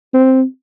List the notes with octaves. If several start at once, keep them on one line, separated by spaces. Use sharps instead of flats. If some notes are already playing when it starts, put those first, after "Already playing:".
C4